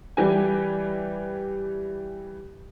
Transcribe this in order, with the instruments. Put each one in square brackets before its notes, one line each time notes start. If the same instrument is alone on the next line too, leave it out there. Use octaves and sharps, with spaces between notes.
[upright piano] E3 G3 G4 B4 G#5